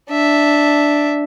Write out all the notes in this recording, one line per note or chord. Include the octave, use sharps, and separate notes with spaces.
D4 E5